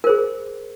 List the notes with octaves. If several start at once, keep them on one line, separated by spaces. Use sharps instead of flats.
G#4 A#4 C5